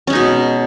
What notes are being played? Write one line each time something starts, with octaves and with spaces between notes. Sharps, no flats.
B2 G#3 C#4 D#4